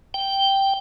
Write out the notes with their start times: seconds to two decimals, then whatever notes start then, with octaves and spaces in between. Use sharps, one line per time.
0.14 G5